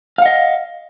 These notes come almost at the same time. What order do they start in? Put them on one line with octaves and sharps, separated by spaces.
F5 F#5 D#5